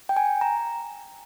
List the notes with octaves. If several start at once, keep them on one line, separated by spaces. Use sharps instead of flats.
G5
G#5
A#5